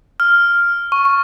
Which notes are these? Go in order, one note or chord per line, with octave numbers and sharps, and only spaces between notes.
F6
C#6
C#6